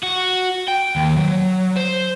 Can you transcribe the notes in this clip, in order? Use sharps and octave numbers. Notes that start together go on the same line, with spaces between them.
F#4
G5
D#2
F#3
C5